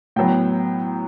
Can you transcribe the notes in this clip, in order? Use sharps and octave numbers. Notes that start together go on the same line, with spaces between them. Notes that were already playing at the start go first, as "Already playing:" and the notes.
A2 F#3 B3 G5